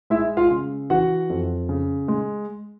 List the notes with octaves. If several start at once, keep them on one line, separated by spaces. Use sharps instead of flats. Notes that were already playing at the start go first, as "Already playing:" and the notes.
G#3 E4 E5
F4 F5
C#3
E3 F#4 F#5
F2
C#3
G#3